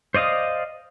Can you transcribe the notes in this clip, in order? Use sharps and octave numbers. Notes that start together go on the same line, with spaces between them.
C5 D5 D#5 F5 D#6